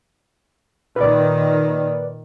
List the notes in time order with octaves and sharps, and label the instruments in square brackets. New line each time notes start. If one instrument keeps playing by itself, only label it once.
[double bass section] A#2 D#3 [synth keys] B4 D5